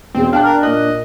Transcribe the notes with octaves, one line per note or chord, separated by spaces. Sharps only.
E1 C4 G#4
D4 F5 G5 A5 F#6
A#4
A#2 A#3 D#5 F#6